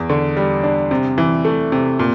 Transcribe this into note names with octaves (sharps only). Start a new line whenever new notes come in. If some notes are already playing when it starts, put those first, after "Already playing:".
Already playing: E2
D3
G3
D4
C3
E3
A3
C3
A#2